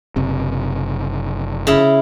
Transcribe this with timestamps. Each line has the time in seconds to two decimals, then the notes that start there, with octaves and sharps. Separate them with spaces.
0.16 F#1 C3
1.67 C#3 E4